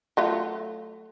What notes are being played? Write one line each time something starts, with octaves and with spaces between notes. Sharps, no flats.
F#3 A3 F4